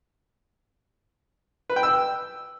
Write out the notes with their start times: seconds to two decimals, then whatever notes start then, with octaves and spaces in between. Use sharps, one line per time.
1.70 B4
1.76 G5
1.83 E6